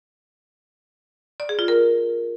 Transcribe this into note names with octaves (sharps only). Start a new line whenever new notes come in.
D5
G#4
F4
A#4